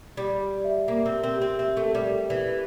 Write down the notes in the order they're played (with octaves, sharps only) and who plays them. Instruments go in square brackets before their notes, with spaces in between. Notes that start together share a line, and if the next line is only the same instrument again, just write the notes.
[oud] G3 [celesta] G4
[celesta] G4
E5
[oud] A#3 [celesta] A#4
[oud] C4
[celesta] G4
[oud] C4
[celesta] G4
[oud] C4
[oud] C4 [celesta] E5
[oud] A3
[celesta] A#4
[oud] G3
[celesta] G4
[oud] E3 [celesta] G4